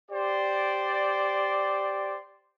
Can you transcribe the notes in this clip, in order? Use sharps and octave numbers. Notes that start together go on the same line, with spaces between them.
G4 C5 D5